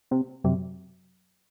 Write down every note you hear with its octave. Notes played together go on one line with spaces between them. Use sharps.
C3
F#2 C3 F#3